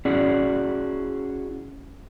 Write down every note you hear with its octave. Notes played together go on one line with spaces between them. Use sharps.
C#4 E4 F#4 G#4 D5